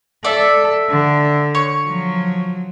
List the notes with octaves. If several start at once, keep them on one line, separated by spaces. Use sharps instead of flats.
A4 D5 E5
D3
C#5
F3 F#3